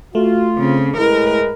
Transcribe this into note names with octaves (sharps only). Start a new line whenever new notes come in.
A3 F4 F#4
C#3 C4
A2 G#3 E4 A#4 B4